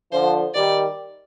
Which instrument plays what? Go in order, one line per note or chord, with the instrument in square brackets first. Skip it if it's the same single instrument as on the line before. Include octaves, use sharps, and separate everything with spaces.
[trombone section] D3 F3 [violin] C5
[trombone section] D#3 G3 [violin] D5